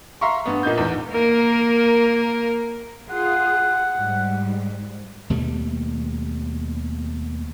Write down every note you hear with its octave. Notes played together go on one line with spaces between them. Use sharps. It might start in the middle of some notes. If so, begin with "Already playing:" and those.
E5 F5 A#5 C6 C#6
G2 B3
A#2 A#3 D#4 G6
E2 G#2
A#3 A#4
F4 G#4 F#5
G#2 G3
D#2 B2 G3 A3